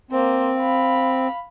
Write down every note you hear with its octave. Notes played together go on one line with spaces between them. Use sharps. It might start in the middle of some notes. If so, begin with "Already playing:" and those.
A#3 C4 C5
F5 B5